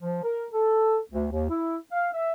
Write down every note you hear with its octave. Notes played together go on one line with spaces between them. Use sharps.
F3
A#4
A4
D2
D#2
E4
F5
E5